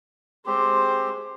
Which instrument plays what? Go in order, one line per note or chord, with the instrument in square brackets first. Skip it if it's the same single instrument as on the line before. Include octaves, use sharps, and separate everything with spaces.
[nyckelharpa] G#3 C5 [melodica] C4 G4